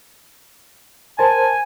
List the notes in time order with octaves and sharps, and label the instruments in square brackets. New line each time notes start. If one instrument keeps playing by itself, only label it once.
[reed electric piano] A#4 C5 A5 [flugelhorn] G#5